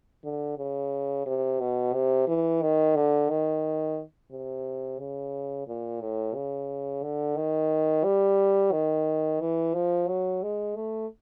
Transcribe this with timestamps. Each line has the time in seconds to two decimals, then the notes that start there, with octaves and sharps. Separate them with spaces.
0.24 D3
0.58 C#3
1.26 C3
1.60 B2
1.93 C3
2.28 E3
2.62 D#3
2.96 D3
3.30 D#3
4.31 C3
4.99 C#3
5.68 A#2
6.01 A2
6.35 C#3
7.03 D3
7.37 D#3
8.04 G3
8.72 D#3
9.40 E3
9.75 F3
10.08 F#3
10.43 G#3
10.76 A3